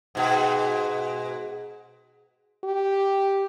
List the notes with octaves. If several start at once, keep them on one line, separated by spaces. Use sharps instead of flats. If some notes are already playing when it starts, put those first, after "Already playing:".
G#2 B2
G4